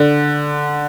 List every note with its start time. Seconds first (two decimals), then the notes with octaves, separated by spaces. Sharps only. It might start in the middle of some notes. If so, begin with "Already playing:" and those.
Already playing: D3